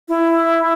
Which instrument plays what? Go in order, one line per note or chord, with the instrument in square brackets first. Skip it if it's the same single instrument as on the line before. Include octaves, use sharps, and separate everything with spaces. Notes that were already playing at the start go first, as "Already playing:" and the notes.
[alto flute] E4